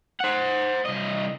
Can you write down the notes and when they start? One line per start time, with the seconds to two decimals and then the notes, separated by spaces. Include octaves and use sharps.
0.20 C5 F#5
0.86 C2 D#5